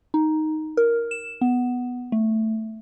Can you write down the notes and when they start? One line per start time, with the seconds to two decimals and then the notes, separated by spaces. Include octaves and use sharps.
0.14 D#4
0.77 A#4
1.11 E7
1.41 B3
2.12 A3